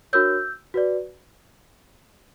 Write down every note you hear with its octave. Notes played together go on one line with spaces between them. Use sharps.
D4 F#4 A#4 C#5 E6 G6
F#4 B4 D5